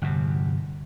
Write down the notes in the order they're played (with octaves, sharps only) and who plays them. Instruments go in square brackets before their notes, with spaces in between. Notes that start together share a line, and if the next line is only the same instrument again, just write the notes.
[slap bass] G1 E2 C3